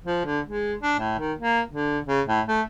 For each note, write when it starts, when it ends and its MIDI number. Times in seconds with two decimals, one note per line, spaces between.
0.05 0.21 53
0.25 0.40 50
0.46 0.74 56
0.82 0.94 62
0.99 1.14 45
1.19 1.33 51
1.38 1.61 58
1.70 1.99 50
2.07 2.21 49
2.27 2.41 45
2.46 2.62 57